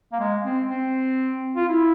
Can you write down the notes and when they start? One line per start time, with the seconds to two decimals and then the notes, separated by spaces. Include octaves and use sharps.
0.12 A#3
0.20 G#3
0.45 C4
0.70 C4
1.56 F4
1.68 E4